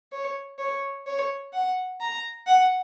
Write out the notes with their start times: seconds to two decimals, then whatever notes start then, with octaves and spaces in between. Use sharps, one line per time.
0.12 C#5
0.59 C#5
1.07 C#5
1.53 F#5
2.00 A#5
2.47 F#5